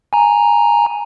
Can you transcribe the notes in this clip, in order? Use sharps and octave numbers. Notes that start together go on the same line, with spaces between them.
G#5 A#5